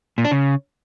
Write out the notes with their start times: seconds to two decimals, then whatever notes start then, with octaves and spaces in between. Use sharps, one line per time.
0.18 A#2
0.25 D4
0.31 C#3